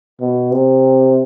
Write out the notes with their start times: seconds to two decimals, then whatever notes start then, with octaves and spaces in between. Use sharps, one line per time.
0.20 B2
0.52 C3